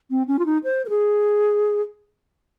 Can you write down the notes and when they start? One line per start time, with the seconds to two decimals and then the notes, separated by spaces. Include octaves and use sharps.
0.10 C4
0.28 C#4
0.39 F4
0.46 D#4
0.64 C5
0.85 A#4
0.90 G#4